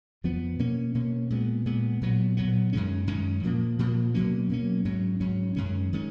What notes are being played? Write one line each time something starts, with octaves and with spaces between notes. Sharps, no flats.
F2 F3 B3
B2 A#3 C#4
B2 A#3 C#4
A#2 G#3 B3
A#2 G#3 B3
A#2 F#3 B3
A#2 F#3 B3
F#2 D#3 G#3 C#4
F#2 D#3 G#3 C#4
A#2 F3 A#3
A#2 F3 A#3
B2 F#3 A#3 C#4
B2 F#3 A#3 C#4
G#2 F#3 C#4
G#2 F#3 C#4
F#2 D#3 G#3 C#4
D#3 G#3 C#4